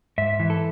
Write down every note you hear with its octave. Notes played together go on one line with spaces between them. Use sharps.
G#2 E5
E3
A4